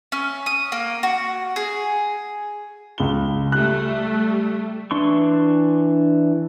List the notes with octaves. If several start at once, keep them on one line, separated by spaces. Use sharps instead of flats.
C#4
D#6
A#3
F#4
G#4
C#2 G7
G3 A3 F#6
E3 D4 C6 C#6